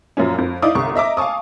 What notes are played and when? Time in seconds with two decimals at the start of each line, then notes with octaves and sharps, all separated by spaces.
0.17 F#2 A#2 F3 C#4
0.38 F2
0.62 D#4 E4 D5 F5 D6 D#6
0.75 G1 C2 C#6
0.95 D#5 E5 A#5 D6
1.17 F5 G#5 A5 C#6 D#6